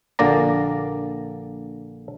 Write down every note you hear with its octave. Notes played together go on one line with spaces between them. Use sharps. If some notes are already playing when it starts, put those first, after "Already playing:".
A#1 D3 A#3 D5 A#5